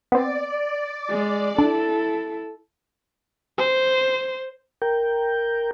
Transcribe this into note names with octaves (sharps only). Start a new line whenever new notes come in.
B3 C4 D5
G#3
D4 E4 A4
C5
A#4 G5